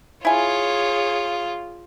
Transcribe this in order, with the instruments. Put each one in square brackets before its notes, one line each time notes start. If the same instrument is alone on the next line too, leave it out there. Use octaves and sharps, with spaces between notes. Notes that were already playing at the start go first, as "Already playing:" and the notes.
[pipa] E4 G#5 [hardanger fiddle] F4 [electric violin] G#4 C#5